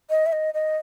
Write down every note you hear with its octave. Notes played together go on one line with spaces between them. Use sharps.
D#5
E5
D#5
D#5